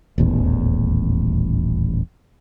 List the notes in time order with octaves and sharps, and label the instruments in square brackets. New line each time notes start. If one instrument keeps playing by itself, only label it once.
[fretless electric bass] D#1 A1 E2